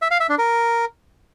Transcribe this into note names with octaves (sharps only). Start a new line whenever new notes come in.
E5
F5
E5
D4
A#4